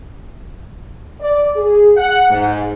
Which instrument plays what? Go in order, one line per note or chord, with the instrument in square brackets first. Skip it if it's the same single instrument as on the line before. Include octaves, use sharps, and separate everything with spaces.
[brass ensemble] D5
G#4
F#5
G#2